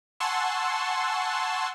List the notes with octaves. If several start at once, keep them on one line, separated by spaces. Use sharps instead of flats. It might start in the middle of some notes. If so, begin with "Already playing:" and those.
F#5 G#5 A5 C6 C#6 E6